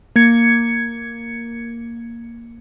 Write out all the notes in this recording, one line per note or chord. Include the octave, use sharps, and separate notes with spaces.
A#3 G#6 C#7